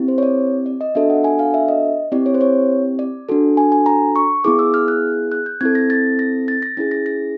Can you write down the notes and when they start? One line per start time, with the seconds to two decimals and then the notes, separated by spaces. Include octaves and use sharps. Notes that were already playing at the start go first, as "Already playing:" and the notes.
Already playing: C4 E4 G4
0.08 C5
0.18 C#5
0.23 D5
0.66 D5
0.81 D#5
0.95 B3 D4 F#4 A4 E5
1.10 F#5
1.24 G#5
1.39 F5
1.54 E5
1.68 D#5
2.12 C4 E4 G4 D5
2.26 C#5
2.34 C5
2.41 C#5
2.99 D5
3.29 D4 F#4 A4
3.57 G#5
3.72 G#5
3.86 A#5
4.16 C#6
4.44 B3 E4 G#4 D6
4.59 E6
4.74 F6
4.88 F#6
5.32 F#6
5.46 G6
5.61 C4 E4 A4 G#6
5.75 A#6
5.90 A6
6.19 A#6
6.48 A6
6.62 A#6
6.77 C#4 E4 G#4 A6
6.91 A#6
7.06 A#6